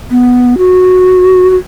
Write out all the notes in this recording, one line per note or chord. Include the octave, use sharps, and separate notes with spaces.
B3
F#4
F#4